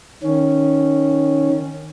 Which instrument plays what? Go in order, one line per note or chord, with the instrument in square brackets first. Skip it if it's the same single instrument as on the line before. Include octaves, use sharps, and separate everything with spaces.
[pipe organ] D#3 C#4